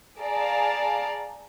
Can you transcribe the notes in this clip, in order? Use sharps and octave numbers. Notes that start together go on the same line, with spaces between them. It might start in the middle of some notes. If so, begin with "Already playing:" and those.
G#4 D5 F5 A5 A#5